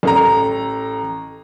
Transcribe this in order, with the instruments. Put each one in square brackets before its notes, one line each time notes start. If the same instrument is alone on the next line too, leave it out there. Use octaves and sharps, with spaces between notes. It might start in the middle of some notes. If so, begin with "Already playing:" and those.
[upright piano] A1 A4 A#5